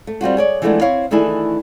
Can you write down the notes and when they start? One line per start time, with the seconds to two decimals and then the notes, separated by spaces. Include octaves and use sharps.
0.07 A3
0.21 G3 C4 F4 F#4
0.37 G#4 C#5 D5
0.62 E3 F3 G#3 A3 B3 D4
0.81 C4 E4 C#5 F5
1.11 D#3 E3 A3 D4 E4 G#4